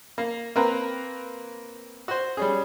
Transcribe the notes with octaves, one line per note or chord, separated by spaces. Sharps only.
A#3
A#3 C4 A#4 B4 A#5
F#4 C5
G3 C#4 G#4